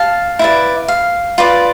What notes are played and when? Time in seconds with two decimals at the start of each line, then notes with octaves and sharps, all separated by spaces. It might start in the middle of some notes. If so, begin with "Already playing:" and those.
Already playing: F5 A5
0.39 E4 B4 D5
0.88 F5
1.38 F4 B4 D5